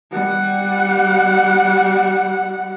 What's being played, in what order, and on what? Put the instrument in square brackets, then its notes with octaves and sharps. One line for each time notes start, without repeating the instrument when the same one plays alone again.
[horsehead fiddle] G3 F#5